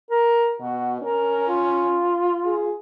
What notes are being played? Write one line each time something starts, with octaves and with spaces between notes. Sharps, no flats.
A#4
B2 F#4
C#4 A#4
F4
G#4